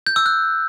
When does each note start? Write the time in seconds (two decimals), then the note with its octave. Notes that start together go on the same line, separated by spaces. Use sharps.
0.07 G6
0.16 E6
0.26 F#6